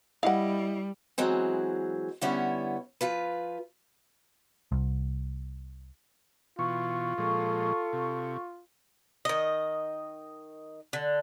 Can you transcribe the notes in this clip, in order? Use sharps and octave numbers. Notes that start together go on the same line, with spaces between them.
G3 E4 D#5 F5 F#5
E3 F#3 G#3 C4
D3 G3 B3 C#4 E4 C#5
F3 F4 B4
C2
B2 E3 F4 C#6
A#2 F3 G#3 A4
C3
D#3 D#5
D3